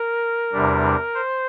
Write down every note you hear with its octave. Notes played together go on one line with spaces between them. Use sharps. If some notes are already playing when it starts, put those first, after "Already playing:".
Already playing: A#4
E2 C3 G3 D4
C5